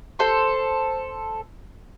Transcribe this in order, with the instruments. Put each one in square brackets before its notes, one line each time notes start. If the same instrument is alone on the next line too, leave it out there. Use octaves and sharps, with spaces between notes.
[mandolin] A4 C5 C6